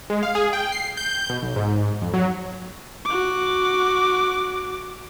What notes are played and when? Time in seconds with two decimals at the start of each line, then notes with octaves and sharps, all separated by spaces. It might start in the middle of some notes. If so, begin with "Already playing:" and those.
0.10 G#3
0.23 F5
0.35 G#4
0.53 G5
0.72 C7
0.97 G6
1.30 B2
1.42 B1
1.56 G#2
2.02 F2
2.14 F#3
3.05 F#4 D6